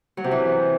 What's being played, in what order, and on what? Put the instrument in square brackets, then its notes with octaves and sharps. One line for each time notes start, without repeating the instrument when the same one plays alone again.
[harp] F#3
C3
E3